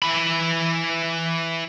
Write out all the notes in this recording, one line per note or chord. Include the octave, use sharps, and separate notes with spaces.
E3 B5